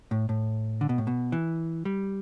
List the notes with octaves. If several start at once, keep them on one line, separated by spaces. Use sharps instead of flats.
A2
A2
D3
B2
A2
B2
E3
G3